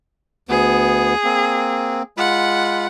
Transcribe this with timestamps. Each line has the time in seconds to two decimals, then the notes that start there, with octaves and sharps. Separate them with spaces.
0.49 D2 B3 G#4
1.24 A#3 C4
2.17 G#3 F4 F#5 B5